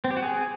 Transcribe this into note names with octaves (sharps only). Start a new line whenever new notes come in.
C4
G4
F#4
G#4